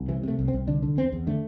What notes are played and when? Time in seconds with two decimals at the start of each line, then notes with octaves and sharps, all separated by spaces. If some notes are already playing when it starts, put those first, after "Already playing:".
Already playing: C2
0.08 C3 E3
0.23 C3 A3
0.39 C2
0.48 C4
0.53 C2
0.67 D3 D4
0.82 D3
0.97 E2 C4
1.12 E2
1.27 D3 A3